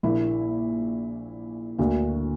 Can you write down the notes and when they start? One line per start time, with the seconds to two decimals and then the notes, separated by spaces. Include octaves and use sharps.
0.03 A#1 A#2 A#3 E4
1.79 D2 D3 A#3 F#4